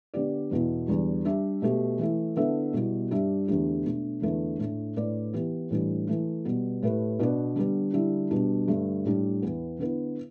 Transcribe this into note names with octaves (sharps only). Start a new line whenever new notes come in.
D3 B3 G4 D5
E2 B2 B3 E4
E2 D3 G3
G3 D4 G4 E5
B2 A3 G4
E3 A3 E4
D3 B3 E4 A4 E5
B2 G3 B3 E4
G2 G3 D4 G4 E5
E2 D3 A3 D4 G4
B2 A3 D4
E2 D3 A3 E4 B4
A2 A3 D4
A2 A3 D4 B4 D5
E3 B3 E4 G4
A2 E3 G3 D4 G4
E3 A3 E4
B2 G3 B3
A2 A3 G4 B4
B2 B3 D4 B4 D5
D3 G3 B3
D3 G3 E4
B2 G3 D4
G2 D3 A3
A2 G3 D4
E2 E3 B3
D3 B3 E4 B4